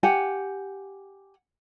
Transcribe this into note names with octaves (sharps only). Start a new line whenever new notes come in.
G4 F#5 G#5